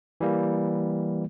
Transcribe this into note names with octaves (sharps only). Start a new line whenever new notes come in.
E3 G3 A#3